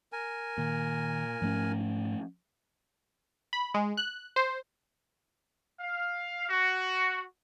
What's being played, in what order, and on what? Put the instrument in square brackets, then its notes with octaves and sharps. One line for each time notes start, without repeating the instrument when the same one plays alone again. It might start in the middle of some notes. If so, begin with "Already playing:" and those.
[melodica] A#4 G#5
[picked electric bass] A#2 [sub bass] D#3
[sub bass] G#2 [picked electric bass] F3 A3 C#4
[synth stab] B5
G#3
F#6
C5
[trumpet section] F5
F#4